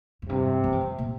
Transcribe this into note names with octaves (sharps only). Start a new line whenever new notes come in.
F2
G2 C3
F3
D#3
F2
A#2